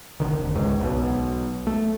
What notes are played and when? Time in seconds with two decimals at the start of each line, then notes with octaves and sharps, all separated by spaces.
0.20 G1 C#2 D3 D#3
0.38 F1
0.55 C#2 G#2
0.81 B1 B2
1.67 A3